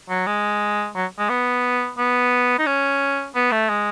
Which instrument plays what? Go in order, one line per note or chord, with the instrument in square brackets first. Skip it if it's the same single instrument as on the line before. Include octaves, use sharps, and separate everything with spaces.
[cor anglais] F#3
G#3
F#3
G#3
B3
B3
D#4
C#4
B3
A3
G#3